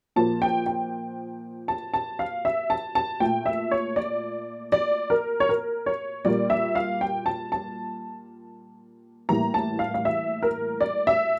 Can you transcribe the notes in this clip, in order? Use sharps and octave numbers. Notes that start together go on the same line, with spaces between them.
A#2 F3 A#3 A5
G5
G5
A5
A5
F5
E5
A5
A5
A#2 A3 G5
E5
C#5
D5
D5
A#4
C#5
A#4
C#5
A#2 G3 A#3 D5
E5
F5
G5
A5
A5
A2 E3 G3 A#3 A#5
A5
F5
F5
E5
A#4
D5
E5